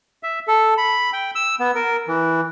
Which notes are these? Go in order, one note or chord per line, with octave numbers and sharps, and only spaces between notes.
E5
A4
B5
G5
E6
B3
A#4
E3